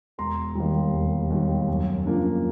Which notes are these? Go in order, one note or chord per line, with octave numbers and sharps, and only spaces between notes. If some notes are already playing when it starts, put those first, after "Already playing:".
E1 A#5 C6
D#2 D#3 G3
E1
D#2 D#3 G3
F#2
C#3 F3 A#3 D4